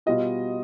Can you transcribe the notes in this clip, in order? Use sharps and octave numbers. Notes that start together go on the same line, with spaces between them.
B2 G3 B3 F4 D#5